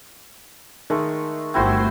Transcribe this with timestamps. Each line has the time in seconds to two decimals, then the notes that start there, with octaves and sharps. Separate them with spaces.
0.90 D#3 G#3 A3
1.54 G1 A3 C4 E4 F#4 C5